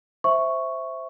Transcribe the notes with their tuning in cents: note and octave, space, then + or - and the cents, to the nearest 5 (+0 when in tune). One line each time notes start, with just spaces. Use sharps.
C5 +0 E5 +0 C#6 +0